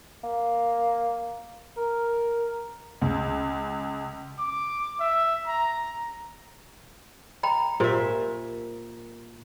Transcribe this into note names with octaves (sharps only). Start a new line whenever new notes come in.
A#3
A#4
C#2
D6
E5
A#5
G5 A#5 B5
A#2 G4 A#4 C5 E5